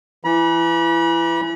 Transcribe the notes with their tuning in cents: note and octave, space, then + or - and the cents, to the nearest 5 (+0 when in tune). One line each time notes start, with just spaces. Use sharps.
E3 +25 B5 -45